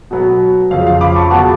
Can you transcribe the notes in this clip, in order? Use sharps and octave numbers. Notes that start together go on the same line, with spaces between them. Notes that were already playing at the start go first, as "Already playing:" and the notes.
B2 F#3 B3
F2 C#3 F3 F5
F5
B5 D6
A5 C#6
C#3 F#3 B3 F#5 A5